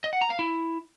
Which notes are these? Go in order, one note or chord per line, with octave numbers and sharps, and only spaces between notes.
D#5
F#5
A#5
F5
E4